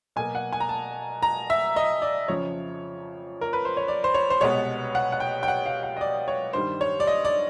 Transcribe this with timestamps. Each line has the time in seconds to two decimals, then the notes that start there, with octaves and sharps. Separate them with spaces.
0.16 B2 F#3 A#3 G#5
0.35 F#5
0.52 G#5
0.60 A#5
0.69 A5
1.22 A#5
1.50 E5
1.76 D#5
2.02 D5
2.28 F2 C#3 F3 C#5
3.41 A#4
3.53 B4
3.65 C5
3.77 C#5
3.88 D5
4.04 C5
4.14 C#5
4.30 C5
4.41 C2 B2 G#3 B3 C#5
4.95 F#5
5.12 F#5
5.20 G5
5.43 G5
5.48 F#5
5.66 F5
5.83 F#5
5.97 D#5
6.01 D5
6.28 C#5
6.53 G2 D#3 G3 C5
6.81 C#5
7.00 D5
7.07 D#5
7.25 D5